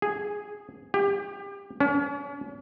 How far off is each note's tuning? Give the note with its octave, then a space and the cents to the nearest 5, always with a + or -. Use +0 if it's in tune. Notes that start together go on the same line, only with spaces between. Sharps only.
G#4 -5
G4 +30
C#4 +40